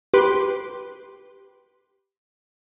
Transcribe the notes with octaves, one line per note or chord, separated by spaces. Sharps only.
G4 B4 C6 D6